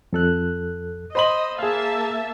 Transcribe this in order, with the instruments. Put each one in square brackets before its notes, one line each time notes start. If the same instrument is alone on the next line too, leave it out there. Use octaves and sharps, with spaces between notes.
[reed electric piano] F2 A4 F#6
[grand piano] C5 B5 F#7 [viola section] D#5
[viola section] A#3 E5 A5 [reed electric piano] G#4 F5